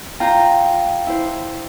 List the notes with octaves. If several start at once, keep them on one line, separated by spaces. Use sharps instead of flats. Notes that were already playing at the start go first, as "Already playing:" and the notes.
F4 G5 A#5
E4 C5